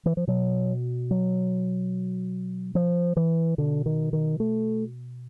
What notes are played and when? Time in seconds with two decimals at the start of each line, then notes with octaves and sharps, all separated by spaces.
0.06 E3
0.17 F3
0.27 B2 F#3
1.11 F#3
2.75 F3
3.17 E3
3.58 B2 D3
3.86 D#3
4.13 D#3
4.40 A3